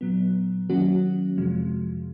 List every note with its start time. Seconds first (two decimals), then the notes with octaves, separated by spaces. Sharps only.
0.01 A#2 F#3 B3
0.70 D#3 F#3 A#3 C#4 F#4
1.37 F2 C3 F3 G#3